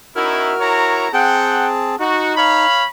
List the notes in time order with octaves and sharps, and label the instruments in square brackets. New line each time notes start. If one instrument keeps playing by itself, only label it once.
[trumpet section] C#4 D#4 E4 [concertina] F#4 A#4 F6
[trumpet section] E4 C#5 A#5
[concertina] C4 G#4 A5 [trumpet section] F#5 G5
[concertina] D#4 [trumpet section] F#4
[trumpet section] C#5 F5 B5